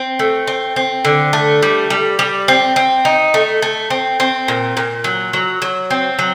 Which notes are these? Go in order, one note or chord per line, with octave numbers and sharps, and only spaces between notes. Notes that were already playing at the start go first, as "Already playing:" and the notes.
Already playing: C4
A3
C4
C4
D3
A3
G3
G3
G3
C4
C4
D#4
A3
A3
C4
C4
A#2
A#2
F#3
F#3
F#3
C4
F#3